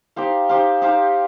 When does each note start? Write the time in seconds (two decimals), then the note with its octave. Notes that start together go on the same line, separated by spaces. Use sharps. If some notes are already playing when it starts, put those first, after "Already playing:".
0.16 D#4 G4 C5 F5
0.49 D#4 G4 C5 F5
0.82 D#4 G4 C5 F5